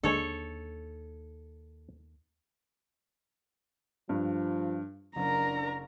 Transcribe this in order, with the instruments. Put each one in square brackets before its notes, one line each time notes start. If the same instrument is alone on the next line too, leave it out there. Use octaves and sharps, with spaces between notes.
[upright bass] D#2 [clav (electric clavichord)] D3 G#3 [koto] A4 C#5
[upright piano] G2 [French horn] F3
[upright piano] F#1 [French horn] D4 [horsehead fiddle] A#4 A#5